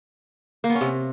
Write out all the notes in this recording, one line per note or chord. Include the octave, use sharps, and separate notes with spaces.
A#3
B3
C#4
C3